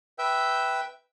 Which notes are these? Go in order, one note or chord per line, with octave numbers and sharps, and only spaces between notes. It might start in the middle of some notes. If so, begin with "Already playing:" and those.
B4 E5 G5 E6 G6